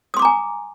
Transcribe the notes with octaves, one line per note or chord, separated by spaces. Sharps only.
G#5 A#5 C6 D6 D#6